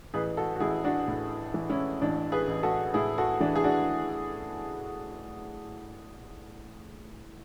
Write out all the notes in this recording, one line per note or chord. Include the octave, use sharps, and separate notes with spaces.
A1 G#4 B4
F#4 A4
F#4
A1 E4 G#4
D4 F#4
A2
E3
C#4 E4
A1 D4
G#4 B4
A1
F#4 A4
A2 E4 G#4
F#4 A4
E3 D4
G#4
D4 F#4